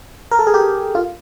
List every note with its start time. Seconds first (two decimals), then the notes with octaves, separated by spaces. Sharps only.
0.31 A#4
0.39 A4
0.47 G#4
0.54 G4
0.95 F4